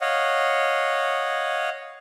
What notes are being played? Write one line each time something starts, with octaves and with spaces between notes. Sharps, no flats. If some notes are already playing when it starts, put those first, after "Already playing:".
C#5 D#5 F5 F#5